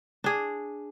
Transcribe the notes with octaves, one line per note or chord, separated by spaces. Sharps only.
D4 G#4